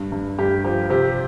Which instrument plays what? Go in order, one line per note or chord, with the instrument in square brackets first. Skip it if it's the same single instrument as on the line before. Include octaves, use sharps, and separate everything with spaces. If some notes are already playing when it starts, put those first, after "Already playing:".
Already playing: [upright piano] G2
G2
G2 G4
F3 G4
C3 G4